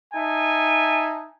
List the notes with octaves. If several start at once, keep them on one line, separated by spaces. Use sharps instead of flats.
D#4 E5 G#5 A5